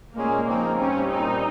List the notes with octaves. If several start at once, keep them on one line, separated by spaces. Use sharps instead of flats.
A#2 G#3 A#3 C#4 G#4
C#3 F3 C4 D#4
G2 G3 C4 C#4
A#2 G3 C4 D#4